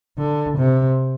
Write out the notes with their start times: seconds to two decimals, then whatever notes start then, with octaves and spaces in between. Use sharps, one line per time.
0.18 D3
0.58 C3